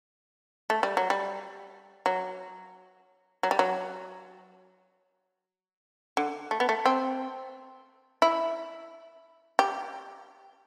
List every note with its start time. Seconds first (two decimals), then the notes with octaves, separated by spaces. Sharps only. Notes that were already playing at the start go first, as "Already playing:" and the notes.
0.70 A3
0.83 G3
0.97 F#3
1.10 G3
2.06 F#3
3.43 F#3
3.51 G3
3.59 F#3
6.17 D3
6.51 A3
6.60 B3
6.69 A3
6.86 C4
8.22 E4
9.59 G4